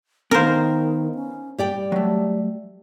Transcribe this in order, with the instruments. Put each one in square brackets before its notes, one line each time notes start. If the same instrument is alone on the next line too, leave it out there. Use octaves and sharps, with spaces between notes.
[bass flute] D#3 [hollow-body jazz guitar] B3 F5 [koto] A#4 C5
[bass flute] C#4
[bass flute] G3 [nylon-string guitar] G4 D5 G5
[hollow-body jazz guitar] F#3 A3